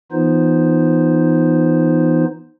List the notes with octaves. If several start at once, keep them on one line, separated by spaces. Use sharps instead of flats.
E3 B3 D#4 F4 C5